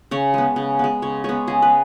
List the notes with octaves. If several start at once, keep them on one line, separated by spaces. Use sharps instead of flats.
C#3 C#5
G#3 B3
C#3
G#3 B3
C#3 C#5
G#3 B3 C#5
C#3 G#4
B4